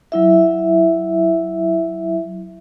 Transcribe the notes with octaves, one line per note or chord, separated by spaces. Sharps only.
F#3 E4 E5